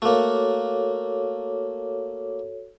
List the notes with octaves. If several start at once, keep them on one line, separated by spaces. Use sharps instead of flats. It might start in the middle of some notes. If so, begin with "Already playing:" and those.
A3 A#3 F#4 A4 C#5